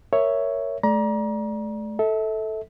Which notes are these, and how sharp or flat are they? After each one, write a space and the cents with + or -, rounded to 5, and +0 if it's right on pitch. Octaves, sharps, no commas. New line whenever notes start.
A#4 +0 C#5 +0 E5 +0
A3 -35 D5 +0 A#5 +30
A4 +0 E5 -35